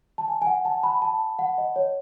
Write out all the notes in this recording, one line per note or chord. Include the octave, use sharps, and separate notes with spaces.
A5
G#5
G#5
F#5
A5
B5
A5
F#5
D#5
C#5